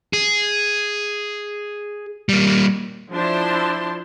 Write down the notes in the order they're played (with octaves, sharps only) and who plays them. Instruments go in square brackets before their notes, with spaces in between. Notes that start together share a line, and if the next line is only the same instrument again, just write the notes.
[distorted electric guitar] G#4
G3 A#3
[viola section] F3 D4 E4 C5 A5 C6